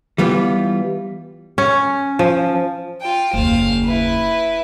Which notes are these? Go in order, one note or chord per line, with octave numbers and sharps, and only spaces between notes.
E3 G3 B3 F4
C#4
F3
F4 G5
F#1 D#2 C5 F5
E4 B4